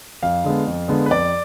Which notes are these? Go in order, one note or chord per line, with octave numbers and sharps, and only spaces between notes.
F2 F5
D3 G#3 B3
F2
D3 G#3 B3
B4
F2 D5